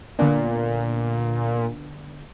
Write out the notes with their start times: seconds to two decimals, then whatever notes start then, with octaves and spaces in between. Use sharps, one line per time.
0.19 A#2 D3 B3 D4